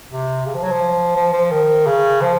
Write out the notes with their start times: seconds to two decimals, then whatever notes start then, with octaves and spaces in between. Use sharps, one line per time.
0.10 C3
0.46 C#3
0.54 F3
0.63 F#3
0.72 F3
1.16 F3
1.33 F3
1.51 D#3
1.86 C#3
2.21 F3